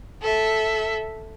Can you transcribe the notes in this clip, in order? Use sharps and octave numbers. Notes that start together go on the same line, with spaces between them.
A4 E5